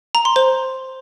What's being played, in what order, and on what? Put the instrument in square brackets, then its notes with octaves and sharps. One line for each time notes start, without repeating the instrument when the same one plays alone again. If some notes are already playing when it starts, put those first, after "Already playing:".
[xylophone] A#5
C6
C5